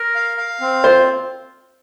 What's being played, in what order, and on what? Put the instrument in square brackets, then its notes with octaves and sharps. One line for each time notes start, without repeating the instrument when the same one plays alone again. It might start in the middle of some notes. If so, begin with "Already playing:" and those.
Already playing: [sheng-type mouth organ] A#4
F5
F5
C4
[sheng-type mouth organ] F4 [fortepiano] C5